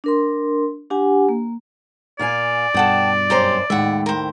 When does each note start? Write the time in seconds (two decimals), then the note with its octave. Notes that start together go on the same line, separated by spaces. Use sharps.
0.04 D4 A#4 C6
0.90 D4 G4 F#5 G#5
1.29 A#3
2.19 A#2 D5 F5 G#5
2.74 G2 B2 A4 F#5 G5 A5 D#6
3.30 F#2 G4 C5 A#5 C6
3.70 D#2 A2 G#3 E5 F#5
4.06 A#4 C5